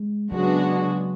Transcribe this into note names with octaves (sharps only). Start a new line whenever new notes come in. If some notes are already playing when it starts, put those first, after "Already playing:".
Already playing: G#3
C#3 F#3 G#3 B3 D4 F#4